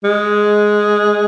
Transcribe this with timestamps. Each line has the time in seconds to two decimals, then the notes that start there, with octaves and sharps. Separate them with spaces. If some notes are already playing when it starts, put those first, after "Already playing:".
0.04 G#3